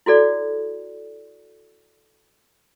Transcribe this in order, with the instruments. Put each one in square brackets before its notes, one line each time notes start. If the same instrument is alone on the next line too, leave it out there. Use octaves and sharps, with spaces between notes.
[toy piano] E4 F#4 A4 D5